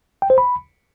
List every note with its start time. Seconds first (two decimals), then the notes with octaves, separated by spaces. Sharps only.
0.22 G5
0.30 C5
0.38 B5